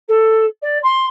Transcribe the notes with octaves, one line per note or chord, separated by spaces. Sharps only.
A4
D5
C6